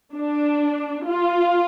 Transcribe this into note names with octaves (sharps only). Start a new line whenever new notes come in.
D4
F4